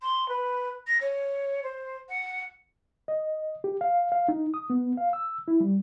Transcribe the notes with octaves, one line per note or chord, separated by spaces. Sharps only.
C6
B4
A#6
C#5
C5
F#5
D#5
G4
F5
F5
D#4
D#6
B3
F5
E6
E4
G3